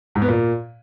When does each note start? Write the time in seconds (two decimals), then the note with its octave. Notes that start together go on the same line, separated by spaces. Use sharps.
0.15 G#2
0.22 B3
0.28 A#2